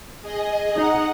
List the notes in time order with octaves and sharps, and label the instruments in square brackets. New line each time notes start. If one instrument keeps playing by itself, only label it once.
[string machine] G#4 D#5
[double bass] D#4 [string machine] F#5